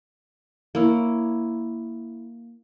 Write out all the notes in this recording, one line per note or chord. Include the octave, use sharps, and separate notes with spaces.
A#3 E4 C#5